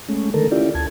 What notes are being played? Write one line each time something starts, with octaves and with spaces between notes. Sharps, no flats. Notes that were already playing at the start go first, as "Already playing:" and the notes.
G#3 A3 C#4
D3 D#3 A3 A4 A#4
C#4 E4 F4 G4 D5
D2 A5 G#6